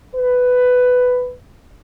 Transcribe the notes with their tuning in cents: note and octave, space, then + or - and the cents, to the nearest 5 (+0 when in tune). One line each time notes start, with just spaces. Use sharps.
B4 +10